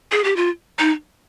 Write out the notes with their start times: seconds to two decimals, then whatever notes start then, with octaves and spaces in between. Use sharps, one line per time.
0.12 G#4
0.24 G4
0.36 F4
0.79 D#4